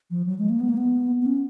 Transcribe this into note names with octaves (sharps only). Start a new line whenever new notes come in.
F3
F#3
G#3
A#3
B3
A#3
B3
B3
C#4